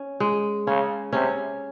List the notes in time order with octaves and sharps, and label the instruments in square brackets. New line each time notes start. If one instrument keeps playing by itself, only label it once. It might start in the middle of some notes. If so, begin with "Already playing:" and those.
Already playing: [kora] C#4
G#3
[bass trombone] C#3 [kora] C#4
[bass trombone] C3 [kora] C#4